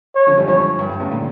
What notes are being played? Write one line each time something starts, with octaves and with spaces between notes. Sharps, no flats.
C#5
D3 F3
E3 G3
D3 F3 C#5
G2
G2
A2 C#3
A#2 D3